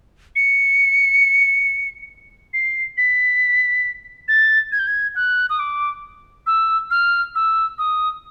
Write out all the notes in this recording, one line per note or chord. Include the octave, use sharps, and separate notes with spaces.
C#7
C7
B6
A6
G#6
G6
G#6
F#6
D#6
D6
E6
F6
E6
D#6